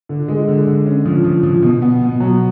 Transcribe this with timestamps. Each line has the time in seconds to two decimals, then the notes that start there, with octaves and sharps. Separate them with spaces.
0.09 D3
0.28 G#3
0.48 D3
0.67 D3
0.86 C#4
1.05 F3
1.24 F3
1.43 F3
1.62 B2
1.82 B3
2.01 B2
2.20 F#3